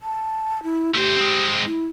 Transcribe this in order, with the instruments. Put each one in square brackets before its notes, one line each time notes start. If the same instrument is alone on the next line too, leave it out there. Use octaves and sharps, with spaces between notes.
[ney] A5
E4
[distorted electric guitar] A3 C5 [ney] G4
[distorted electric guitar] G#3 C4
[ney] E4